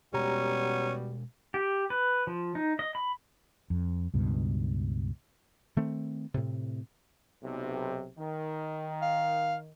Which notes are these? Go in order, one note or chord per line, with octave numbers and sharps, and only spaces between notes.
B2 G3 G#3 B3 C#4 F#4 G4 A#5
G4
B4
F3
D#4
D#5
B5
F2
C#2 G2 B2
D#3 A3 C4
A2 C3
B1 C3
D#3
F5